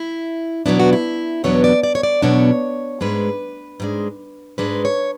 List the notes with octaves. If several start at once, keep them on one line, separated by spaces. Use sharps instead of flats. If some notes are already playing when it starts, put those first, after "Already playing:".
Already playing: E4
E2 B2 F#3 B3 D4 E4
F#4
E4
E2 B2 F#3 B3 D4 C#5
D5
D5
C#5
D5
E2 B2 F#3 B3 D4 C#5
G#2 G#3 D4 B4
G#2 G#3 D4
G#2 G#3 D4 B4
C#5